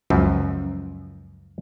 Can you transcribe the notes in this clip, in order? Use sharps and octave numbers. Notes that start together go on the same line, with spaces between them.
C#2 F#2 F3